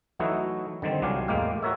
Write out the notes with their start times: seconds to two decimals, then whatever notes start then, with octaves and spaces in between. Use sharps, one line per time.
0.19 E3 F#3 A3 D#4 E4 F#4
0.82 D3 D#3 G3 C4
1.02 C2 F#3 D4 G4 F5 G#5
1.28 E2 A2 G#3 A#3 G4 F5
1.63 F4 F#4 A#4 C#5 E5